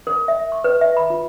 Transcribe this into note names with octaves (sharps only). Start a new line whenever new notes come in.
A#4
E5
C#6
B4
E5
B5
F4